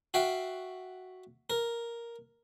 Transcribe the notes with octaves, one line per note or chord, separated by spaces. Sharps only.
F#4 E5 F5 G5
A#4